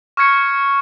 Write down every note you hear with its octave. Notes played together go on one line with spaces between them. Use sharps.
C#6 F6 G#6 C#7